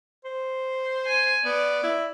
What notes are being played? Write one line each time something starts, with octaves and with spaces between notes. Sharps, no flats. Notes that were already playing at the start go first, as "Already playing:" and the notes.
C5
G#5
B3 D5
E4